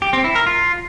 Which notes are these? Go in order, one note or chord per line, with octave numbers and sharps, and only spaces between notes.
G4
C4
E4
A#4
F4